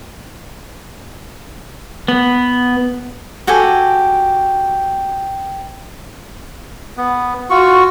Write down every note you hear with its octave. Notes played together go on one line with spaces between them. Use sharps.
B3
F#4 G4 A4 G#5
B3
F4 F#4 C#6